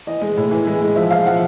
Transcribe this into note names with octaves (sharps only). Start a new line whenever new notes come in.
E3 D#5
G#3
A2
E3
G#3
G#3
F3 E5
G#3 F5
F3 F#5